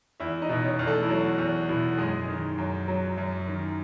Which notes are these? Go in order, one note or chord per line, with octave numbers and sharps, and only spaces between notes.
E2 E4 E5
D#4 D#5
B2
C#4 C#5
E2
A3 A4
E4
F#3 F#4
E2
B2 E4
F#2 G#3 G#4
D#3
F#2
F#3
F#2
D#3